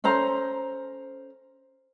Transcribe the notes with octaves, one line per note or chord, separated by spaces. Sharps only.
C#4 A4 C5 A#5